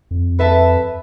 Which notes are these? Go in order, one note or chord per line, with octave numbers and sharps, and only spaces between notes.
F2
A4 B4 E5 A5